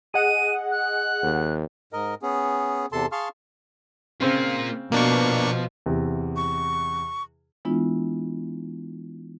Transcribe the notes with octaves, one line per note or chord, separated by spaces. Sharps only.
G#4 D#5 F#5 D#7
F#6
D#2
G#2 A#4 D#5
B3 C#4 G#4
E2 C3 A4 A5 C6
G#4 F5 A5 C6 C#6 F6
C#3 A#3 C4 F4
B2 F3 A#3 D4 G5 C#6
E2 C3
C#6
E3 G#3 B3 D4 E4 F4